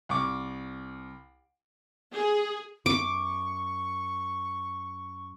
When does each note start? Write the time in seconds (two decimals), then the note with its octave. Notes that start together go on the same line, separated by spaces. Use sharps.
0.09 C2 C#6 D6
2.11 G#4
2.86 F#2 C#6 D6